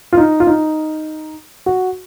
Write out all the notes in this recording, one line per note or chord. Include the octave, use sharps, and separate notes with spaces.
F4
D#4
F4
D#4
F#4